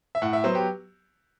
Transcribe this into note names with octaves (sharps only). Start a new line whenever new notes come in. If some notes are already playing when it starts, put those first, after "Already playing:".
E5
A2 F#5
E5
F#3 B3 C5
G4